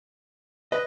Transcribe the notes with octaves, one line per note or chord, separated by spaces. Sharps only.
B4 D#5